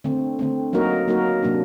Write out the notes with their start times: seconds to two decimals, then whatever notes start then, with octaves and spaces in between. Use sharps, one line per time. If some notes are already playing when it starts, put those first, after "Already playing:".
0.04 D3 A3 C4
0.39 D3 A3 C4
0.73 F#3 A#3 D#4 F#4 A#4
1.08 F#3 A#3 D#4 F#4 A#4
1.43 C3 F#3 A#3 D4